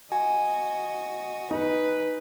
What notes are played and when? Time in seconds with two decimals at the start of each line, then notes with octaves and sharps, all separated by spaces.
0.12 F#4 D#5 G#5
1.51 D#4 B4